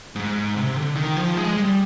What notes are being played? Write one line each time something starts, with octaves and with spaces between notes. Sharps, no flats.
G#2
C3
D3
D#3
F3
G#3
G3